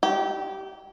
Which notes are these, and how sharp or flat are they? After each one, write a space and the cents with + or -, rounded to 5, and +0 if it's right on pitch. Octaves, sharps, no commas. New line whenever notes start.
G4 -20